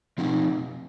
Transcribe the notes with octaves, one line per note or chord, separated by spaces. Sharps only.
F3 C4 D#4